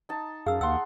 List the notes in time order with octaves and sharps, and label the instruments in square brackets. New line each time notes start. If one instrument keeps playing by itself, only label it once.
[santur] D#4 A5
[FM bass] F#2 [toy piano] G#4 E6 [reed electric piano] F5
[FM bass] D#2 [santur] F#5 C6 [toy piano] E6